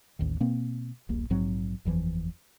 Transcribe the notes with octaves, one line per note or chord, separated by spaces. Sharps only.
A1 D#2 D#3
B2 A#3 C4
D#1 A#1 A#3
A#1 G#2 F#3 C4
F#1 E2 E3 F3